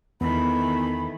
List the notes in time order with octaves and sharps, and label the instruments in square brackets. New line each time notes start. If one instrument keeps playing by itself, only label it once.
[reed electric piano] E2 [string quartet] D#3 E3 A3 [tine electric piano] B3 [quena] B5